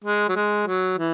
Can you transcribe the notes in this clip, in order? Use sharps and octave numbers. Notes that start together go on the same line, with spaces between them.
G#3
F#3
G#3
F#3
E3